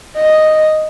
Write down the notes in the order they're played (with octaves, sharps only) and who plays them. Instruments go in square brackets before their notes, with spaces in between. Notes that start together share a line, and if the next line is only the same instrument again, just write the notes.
[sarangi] D#5